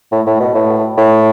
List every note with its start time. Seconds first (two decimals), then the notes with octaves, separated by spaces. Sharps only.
0.12 A2
0.27 A2
0.40 B2
0.55 A2
0.97 A2